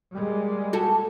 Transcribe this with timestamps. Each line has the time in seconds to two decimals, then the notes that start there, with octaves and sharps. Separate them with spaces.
0.14 G3 G#3 A#3
0.73 F#4 G4 A4